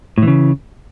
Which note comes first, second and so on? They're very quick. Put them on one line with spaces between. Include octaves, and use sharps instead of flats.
A2 E3 C#3